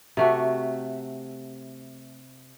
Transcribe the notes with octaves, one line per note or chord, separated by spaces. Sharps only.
C3 A3 F#4